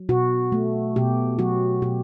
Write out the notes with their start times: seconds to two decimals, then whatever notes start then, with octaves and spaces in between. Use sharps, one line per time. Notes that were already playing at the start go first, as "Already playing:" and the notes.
Already playing: F#3
0.09 B2 F#4
0.52 A3
0.96 B2 G4
1.39 F#3 F#4
1.82 B2 G4